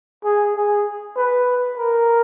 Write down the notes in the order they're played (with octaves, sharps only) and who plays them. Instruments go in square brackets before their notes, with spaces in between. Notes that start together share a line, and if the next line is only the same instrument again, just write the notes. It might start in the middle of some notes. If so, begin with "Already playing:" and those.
[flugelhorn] G#4
G#4
B4
A#4